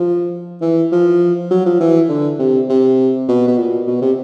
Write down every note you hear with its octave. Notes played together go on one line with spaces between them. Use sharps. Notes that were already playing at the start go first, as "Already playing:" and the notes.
Already playing: F3
E3
F3
F#3
F3
E3
D3
C3
C3
B2
B2
A#2
B2
C3